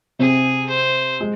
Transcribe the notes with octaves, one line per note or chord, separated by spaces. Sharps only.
C3 C4 G#4
C5
G#3